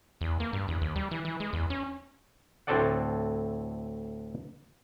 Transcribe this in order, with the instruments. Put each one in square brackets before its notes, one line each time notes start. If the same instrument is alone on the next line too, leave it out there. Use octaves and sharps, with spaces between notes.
[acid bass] E2
A#3
G2
E2
D#2
G3
E3
E3
G#3
E2
C#4
[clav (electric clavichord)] D2 A2 C4 A4 D5 F#5